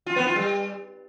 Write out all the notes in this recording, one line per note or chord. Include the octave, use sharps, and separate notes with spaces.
F4
B3
F4
G3